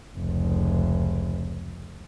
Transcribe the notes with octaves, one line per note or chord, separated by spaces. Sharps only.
F1 C#2